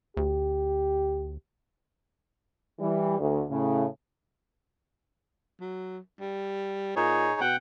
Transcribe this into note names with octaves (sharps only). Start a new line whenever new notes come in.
D2 G4
E3 G3
D2
A2 C#3
F#3
G3
A#2 D#4 G#4 C#5
B2 F#5 G5